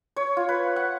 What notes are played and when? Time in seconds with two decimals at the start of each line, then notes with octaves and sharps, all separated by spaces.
0.16 C#5
0.37 F4
0.49 B4
0.76 F#5